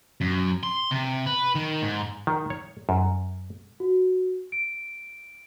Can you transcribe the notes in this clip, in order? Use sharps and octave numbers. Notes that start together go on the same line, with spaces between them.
F#2
C6
C3
B4
D#3
G#2
D#3
C#5
F#2
F#4
D7